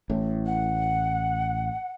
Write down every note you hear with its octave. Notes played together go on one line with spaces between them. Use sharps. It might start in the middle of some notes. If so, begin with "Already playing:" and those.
A1 A2
F#5